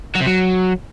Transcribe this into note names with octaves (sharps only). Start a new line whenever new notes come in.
F#3
C3
F#3